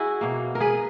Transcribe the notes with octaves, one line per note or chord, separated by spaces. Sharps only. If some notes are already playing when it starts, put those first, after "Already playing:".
Already playing: E4 F#4 G#4
B2 A#3
A#4
G#4 B4